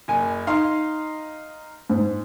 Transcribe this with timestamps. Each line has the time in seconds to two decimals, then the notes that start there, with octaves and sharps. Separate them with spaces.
0.08 F#1 G#5
0.47 D#4 F5 C6
1.90 G#2